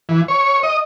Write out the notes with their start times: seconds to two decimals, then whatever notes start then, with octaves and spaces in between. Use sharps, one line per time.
0.09 E3
0.28 C#5
0.63 D#5